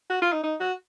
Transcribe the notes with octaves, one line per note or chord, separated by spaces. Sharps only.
F#4
F4
D#4
D#4
F#4